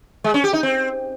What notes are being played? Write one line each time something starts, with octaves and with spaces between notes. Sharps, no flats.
G#3
C#4
G4
D#4
C4